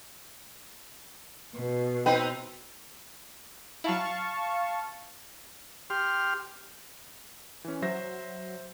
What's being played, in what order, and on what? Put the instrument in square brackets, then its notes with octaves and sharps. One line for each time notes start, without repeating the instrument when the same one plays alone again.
[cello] B2
[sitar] C4 D#4 B4 [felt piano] G5
[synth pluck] F#3 E4 [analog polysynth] F5 A5 C#6
[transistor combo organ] G4 C6 F6
[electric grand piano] E3 C#4
[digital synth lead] F#3 [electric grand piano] C5 E5 A#6